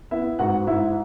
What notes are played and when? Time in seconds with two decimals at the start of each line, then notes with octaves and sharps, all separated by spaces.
0.11 B3 E4 E5
0.39 G#2 F#4 F#5
0.67 G#2 E4 E5